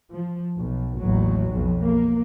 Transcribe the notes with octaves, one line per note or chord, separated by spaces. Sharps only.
F3
B1
A1 D#2 F#3
B1 F2
A#3